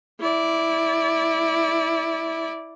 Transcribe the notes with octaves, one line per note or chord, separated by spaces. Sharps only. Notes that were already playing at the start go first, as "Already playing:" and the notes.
E4 D5